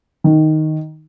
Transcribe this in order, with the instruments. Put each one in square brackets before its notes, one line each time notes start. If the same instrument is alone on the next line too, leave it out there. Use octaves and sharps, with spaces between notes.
[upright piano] D#3